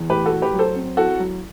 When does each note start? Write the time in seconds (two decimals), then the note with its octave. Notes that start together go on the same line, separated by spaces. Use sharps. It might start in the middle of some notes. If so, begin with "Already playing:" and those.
Already playing: E2
0.09 A2 G4 B4
0.26 F#4 A4
0.31 A2
0.42 G4 B4
0.54 F#3
0.59 A4 C5
0.75 C4
0.97 E4 F#4 A4
1.19 F#3